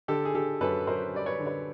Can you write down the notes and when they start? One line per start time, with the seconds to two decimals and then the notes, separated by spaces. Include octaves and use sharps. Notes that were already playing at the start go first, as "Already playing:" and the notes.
0.08 D3 G4 A4
0.25 G#4
0.35 D3 G4 A4
0.61 F#2 A4 B4
0.87 F#2 A#4 C5
1.14 G3 D5
1.26 B4 C#5
1.40 D3
1.46 B4 C#5